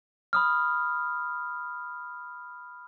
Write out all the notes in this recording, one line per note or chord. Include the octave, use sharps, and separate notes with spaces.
B5 D#6 F6